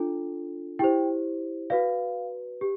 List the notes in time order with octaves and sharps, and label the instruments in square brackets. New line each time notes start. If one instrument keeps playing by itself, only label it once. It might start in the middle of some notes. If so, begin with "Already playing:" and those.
Already playing: [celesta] D4 F4 A4
E4 G4 C5 G5
F#4 B4 D5 F5
G4